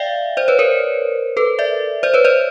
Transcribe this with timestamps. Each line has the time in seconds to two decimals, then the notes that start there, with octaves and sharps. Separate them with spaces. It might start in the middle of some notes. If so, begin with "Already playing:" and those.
Already playing: D5 E5 F5 G5
0.37 C5 D5
0.48 B4 C#5
0.59 A#4 C5
1.37 A4 B4
1.59 D5 E5
2.03 C5 D5
2.14 B4 C#5
2.25 C5 D5